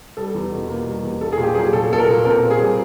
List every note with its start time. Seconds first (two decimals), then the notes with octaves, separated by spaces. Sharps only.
0.17 G3 A4
0.34 E2
0.52 B2
0.69 A#3
0.87 G3
1.04 E2
1.21 A#3 A4
1.33 G#4
1.38 A#2
1.43 G4
1.55 F#3 G#4
1.73 A#2 A4
1.90 A#3 A4
1.98 A#4
2.08 A#2
2.25 C4 A#4
2.43 A#2
2.51 G#4
2.59 G3